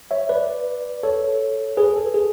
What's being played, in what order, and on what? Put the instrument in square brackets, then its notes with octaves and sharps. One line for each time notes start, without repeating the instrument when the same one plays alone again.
[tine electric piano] C#5 E5
B4 D5
A4 C#5
G#4 B4
A4
G#4